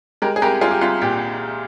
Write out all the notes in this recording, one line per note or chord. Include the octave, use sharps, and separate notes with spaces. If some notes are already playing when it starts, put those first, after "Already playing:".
G#3 G4 A#4
G#4
C2 G4 A#4
C2 F4 G#4
G4
C2 F4
A#2 G4